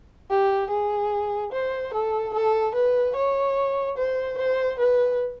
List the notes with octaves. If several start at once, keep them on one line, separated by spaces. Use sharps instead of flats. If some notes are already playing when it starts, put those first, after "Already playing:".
G4
G#4
C5
A4
A4
B4
C#5
C5
C5
B4